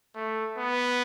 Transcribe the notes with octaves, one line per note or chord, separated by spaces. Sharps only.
A3
B3